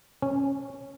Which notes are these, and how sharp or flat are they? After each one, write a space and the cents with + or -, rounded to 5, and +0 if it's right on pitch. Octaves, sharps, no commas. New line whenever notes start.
C#4 -10